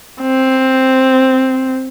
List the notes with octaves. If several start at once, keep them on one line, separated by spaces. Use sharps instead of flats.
C4